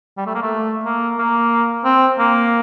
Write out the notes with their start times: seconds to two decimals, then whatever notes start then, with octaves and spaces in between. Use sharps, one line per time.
0.17 G3
0.26 A3
0.35 A#3
0.42 A3
0.85 A#3
1.18 A#3
1.84 C4
2.19 A#3